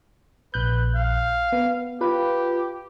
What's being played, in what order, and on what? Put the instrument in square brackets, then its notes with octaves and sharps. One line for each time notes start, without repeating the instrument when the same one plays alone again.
[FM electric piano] A#1 F#6 G6 [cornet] B4
[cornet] F5
[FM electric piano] B3
[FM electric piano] F4 B4 [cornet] G4